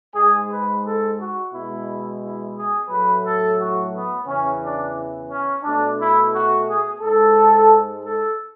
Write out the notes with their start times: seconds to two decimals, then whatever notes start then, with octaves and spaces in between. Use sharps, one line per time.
0.14 G#2 G#3 G#4
0.49 B4
0.83 A4
1.17 F#4
1.51 B2 G#3 E4
2.20 E4
2.55 G#4
2.89 A2 F#3 A3 B4
3.23 A4
3.57 F#4
3.91 B3
4.26 E2 C#3 E3 C#4
4.61 D4
5.29 C#4
5.64 B2 A3 D4
5.98 E4
6.32 F#4
6.67 G#4
7.00 G#2 G#3 A4
8.03 A4